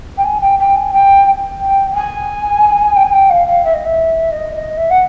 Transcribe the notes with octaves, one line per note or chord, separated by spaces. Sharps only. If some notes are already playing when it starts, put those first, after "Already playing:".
G5
G#5
G5
G5
G#5
G5
G5
G5
G#5
G5
G#5
G5
F5
F5
E5
D#5
E5
D#5
D#5
E5
F#5